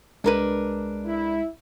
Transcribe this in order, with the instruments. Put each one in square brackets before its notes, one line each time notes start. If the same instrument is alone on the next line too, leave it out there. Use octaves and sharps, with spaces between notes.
[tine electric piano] C2 G#3 [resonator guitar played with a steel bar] D4 A#4 B4
[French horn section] E4